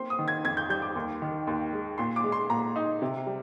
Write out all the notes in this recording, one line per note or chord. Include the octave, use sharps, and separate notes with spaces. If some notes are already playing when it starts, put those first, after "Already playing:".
Already playing: A#3 C4 C6
D#6
D#3
G#6
F2 G#6
G6
G3 G6
D6
D#2
D#3
D#2
G#3
A#2 C6
D6
G#3
C6
A#2 A#5
D#4
C3
G3